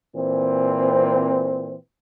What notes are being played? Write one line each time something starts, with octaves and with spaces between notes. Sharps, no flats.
A#2 E3 C4